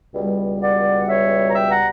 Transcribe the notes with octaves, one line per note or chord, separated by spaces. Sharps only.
C#2 B2 G3
D5 F#5
C#5 E5
A#5
E5 G5
F#5 A#5